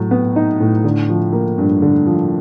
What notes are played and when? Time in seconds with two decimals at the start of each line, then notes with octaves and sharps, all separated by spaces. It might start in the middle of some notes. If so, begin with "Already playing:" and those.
Already playing: A2 F#3
0.11 B3
0.36 D#4
0.60 A2
0.84 D3
1.09 F3
1.33 A#3
1.58 G2
1.82 D3
2.06 F3